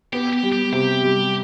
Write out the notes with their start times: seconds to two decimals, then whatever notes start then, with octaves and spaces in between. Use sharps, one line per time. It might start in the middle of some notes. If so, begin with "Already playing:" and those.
0.13 B3 G4
0.33 G4
0.43 G3
0.52 G4
0.72 C3 G4
1.03 G3